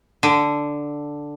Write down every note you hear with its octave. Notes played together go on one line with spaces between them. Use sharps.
D3